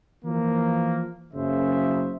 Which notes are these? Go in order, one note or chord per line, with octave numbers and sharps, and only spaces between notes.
E3 F3 A#3
F#1 F#2 C#3 C5 E5